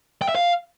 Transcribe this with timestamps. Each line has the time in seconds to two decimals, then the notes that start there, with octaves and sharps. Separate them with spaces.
0.22 G5
0.29 E5
0.35 F5